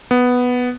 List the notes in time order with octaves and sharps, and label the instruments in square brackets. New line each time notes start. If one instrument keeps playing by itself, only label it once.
[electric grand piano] B3